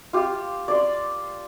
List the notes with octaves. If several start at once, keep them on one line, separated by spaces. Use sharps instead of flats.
F4 G4
D5 C6